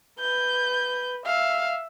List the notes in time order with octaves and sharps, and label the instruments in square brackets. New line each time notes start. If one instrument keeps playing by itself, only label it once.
[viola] B4 [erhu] G6
[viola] E5 [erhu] F5